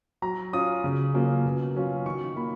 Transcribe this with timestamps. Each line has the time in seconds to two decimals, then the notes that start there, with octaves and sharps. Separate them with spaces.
0.22 F#3 A#5
0.53 C#4 F4 D#6
0.84 C#3
1.14 F#3 A#3 C#4 F4
1.45 B2
1.75 F#3 C#4 F4
2.06 D#3 C#6
2.35 A#3 F4 B5